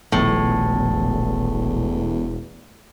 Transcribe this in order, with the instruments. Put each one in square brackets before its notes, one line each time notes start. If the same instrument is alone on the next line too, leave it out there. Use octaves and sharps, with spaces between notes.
[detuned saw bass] E1 [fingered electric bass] A#1 D#3 F3 [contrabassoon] E2 [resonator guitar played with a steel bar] A2